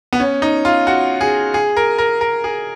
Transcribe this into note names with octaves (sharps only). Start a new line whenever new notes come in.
B3
C#4
D#4
F4
F#4
G#4
G#4
A#4
A#4
A#4
G#4